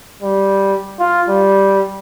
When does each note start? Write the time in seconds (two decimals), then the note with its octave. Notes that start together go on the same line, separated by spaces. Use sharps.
0.23 G3
1.00 F4
1.29 G3